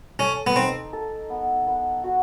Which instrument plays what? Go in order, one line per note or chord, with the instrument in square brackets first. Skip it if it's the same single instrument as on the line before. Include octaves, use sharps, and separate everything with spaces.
[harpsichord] C#4 [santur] A4
[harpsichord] B3
[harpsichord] C4 [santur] D#4
[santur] A4
B3
B3
F#4